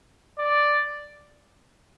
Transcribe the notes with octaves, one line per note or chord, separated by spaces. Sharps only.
D5